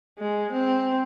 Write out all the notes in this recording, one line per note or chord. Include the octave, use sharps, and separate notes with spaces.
G#3
C4